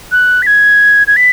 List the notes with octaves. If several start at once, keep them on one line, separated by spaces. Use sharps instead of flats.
F#6
B6
G#6
G#6
B6